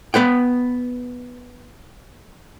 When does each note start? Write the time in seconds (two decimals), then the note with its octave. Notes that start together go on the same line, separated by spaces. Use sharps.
0.14 B3 B4 F#5 G5